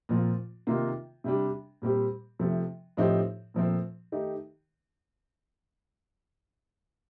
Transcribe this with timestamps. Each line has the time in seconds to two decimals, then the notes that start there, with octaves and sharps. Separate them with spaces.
0.09 A#2 F3 C4 F4
0.67 C3 D#3 A#3 F4
1.24 C3 G3 D4
1.82 A#2 G3 C4 G4
2.39 C3 F3 A3
2.97 A2 F3 C4 D#4 G4
3.54 A#2 F3 A3 C4
4.12 D#3 A3 D#4 G4